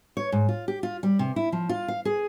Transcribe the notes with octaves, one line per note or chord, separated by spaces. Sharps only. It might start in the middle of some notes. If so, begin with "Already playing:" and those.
C#5
G#2
F4
G4
F4
G3
C3
E4
F3
F4
F5
G#4